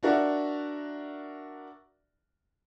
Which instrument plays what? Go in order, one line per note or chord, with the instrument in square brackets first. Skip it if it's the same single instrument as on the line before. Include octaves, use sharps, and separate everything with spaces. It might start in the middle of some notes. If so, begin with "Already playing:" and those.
[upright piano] D4 F#4 A#4 D5 E5